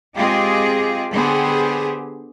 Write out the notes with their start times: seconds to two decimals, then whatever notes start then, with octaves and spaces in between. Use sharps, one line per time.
0.16 G#3 C4 F4 G4 G#4 D#5
1.13 D3 B3 G4 G#4 C5